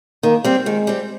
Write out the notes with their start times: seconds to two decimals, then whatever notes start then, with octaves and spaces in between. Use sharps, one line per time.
0.23 D#3 A#3
0.44 G3 C4
0.66 D#3 G#3
0.87 G3 C4